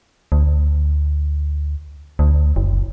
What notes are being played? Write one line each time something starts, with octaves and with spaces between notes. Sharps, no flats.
D2
D2
F#1